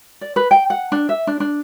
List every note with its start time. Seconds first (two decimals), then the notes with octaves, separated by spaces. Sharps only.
0.21 D5
0.36 B4
0.51 G5
0.70 F#5
0.92 D4
1.09 E5
1.27 D4
1.40 D4